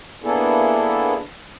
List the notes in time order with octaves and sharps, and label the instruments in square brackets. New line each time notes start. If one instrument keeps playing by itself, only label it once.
[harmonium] A#3 B3 D4 E4 G#4 A4